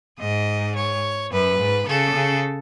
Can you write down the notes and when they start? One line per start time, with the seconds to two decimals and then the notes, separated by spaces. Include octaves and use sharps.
0.19 G#2 D#5
0.75 C#5
1.32 F#2 B4
1.59 G#2
1.88 C#3 A4
2.16 C#3